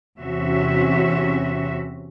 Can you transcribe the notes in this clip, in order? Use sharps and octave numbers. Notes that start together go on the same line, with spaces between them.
E2 C3 C#4 F#4 E5